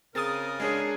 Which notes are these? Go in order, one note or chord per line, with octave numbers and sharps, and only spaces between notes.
C#3 C4 G#4 A#4 D#6 A6
G#3 D4 G#4 C#5